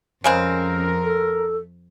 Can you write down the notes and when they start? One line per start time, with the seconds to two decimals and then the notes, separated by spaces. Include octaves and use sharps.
0.24 F2 C#3 G#3 C4 C#4 A#4
1.04 A4